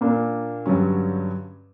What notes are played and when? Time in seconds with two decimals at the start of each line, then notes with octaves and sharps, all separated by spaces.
0.01 A#2 A#3 D4
0.66 G2 D3 F#3 C#4